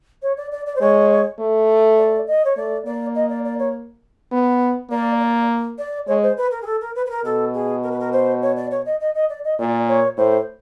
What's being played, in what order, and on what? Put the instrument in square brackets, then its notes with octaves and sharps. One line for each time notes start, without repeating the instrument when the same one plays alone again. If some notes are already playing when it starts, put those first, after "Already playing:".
[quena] C#5
D5
D5
D5
C5
[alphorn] G#3 [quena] C#5
[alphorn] A3
[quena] D5
D#5
C#5
[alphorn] A3 [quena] D5
[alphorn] A#3 [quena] D5
[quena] D#5
D5
D5
C#5
[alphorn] B3
[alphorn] A#3 [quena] D5
[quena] D5
D5
[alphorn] G#3 [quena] C#5
[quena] C5
B4
A#4
G#4
A4
A#4
B4
B4
A#4
[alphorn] B2 [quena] A4
[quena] G#4
A#4
B4
A#4
C5
C#5
D5
C#5
D#5
D#5
D#5
D5
D#5
[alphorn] A#2 [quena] D5
[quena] C#5
[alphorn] A2 [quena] C5